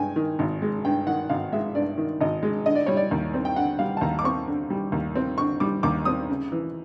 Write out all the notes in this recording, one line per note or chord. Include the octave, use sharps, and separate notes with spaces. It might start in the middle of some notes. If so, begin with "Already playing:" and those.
Already playing: G2 G#3 G5 G#5
D#3
G#1
G#3
G2 G5
D#3 F#5
G#1 F5
G#3 E5
G2 D5
D#3
G#1 D#5
G#3
D3 D#5
D5
G3 C#5
D5
D#2
C4
G5
D3 F#5
G3 F5
A5
D#2 A#5
D6
C4 C#6
D3
G3
D#2
C4
D3 C#6
G3 D6
D#2 D6
C4 D#6
C#3
E3